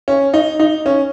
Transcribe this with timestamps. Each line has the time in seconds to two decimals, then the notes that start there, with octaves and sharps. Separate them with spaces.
0.08 C#4
0.34 D#4
0.59 D#4
0.86 C#4